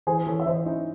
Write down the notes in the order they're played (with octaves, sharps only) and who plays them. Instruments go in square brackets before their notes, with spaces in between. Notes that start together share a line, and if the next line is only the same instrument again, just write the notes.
[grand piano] E3 [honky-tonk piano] G#4 C5
[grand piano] E3 [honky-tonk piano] A4 C#5
[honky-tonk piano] E5
[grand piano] E3 [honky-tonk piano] C5 D#5
[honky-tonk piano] C#4 E4 [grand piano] D#4